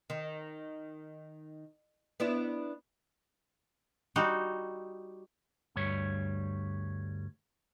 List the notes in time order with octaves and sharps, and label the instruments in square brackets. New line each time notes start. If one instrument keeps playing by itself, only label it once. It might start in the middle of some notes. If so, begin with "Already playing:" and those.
[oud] D#3
B3 D4 E4
[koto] G3 D#4 F#4
[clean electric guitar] D2 G2 G3 C#5